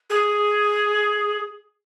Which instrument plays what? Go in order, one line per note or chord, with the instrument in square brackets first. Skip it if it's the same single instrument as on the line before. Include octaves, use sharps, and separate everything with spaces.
[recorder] G#4